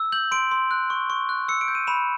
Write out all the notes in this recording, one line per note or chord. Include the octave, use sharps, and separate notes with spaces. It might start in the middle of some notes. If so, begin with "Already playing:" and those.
Already playing: E6
G6 F#7
C6 D7
C6
F#6
C#6
C#6
F#6
E6 C#7
D7
G6
D#7
B5 E7